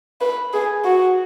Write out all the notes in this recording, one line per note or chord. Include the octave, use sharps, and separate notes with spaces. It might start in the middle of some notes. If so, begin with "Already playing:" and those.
B4
G#4
F#4